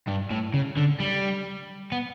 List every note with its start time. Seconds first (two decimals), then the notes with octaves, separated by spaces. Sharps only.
0.07 G2
0.30 A2
0.54 C#3
0.77 D3
1.00 G3
1.92 B3